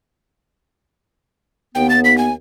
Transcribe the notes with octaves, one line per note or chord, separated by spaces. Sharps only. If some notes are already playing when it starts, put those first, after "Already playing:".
D#2 B3 G5
A6
B6
G#5